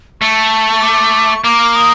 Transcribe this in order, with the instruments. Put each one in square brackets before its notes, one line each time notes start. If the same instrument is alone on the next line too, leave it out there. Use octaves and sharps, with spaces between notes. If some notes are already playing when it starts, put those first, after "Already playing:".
[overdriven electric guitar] A3 [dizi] C#6
[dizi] D6
C#6
[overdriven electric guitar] A#3 [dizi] D6
[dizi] D#6